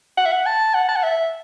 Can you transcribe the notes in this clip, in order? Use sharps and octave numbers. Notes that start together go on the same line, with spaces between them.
F#5
E5
F#5
A5
F#5
A5
F#5
E5